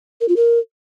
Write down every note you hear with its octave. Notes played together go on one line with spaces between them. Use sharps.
A#4
F4
A#4